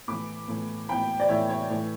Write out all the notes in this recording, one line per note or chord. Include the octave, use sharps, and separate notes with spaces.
A2 E3 B5 D6
A2 E3
A2 E3 G5 B5
D5
A2 E3 C#5 E5
C#5 E5
A2 E3